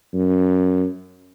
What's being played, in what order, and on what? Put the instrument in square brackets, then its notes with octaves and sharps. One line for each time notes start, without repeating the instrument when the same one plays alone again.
[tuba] F#2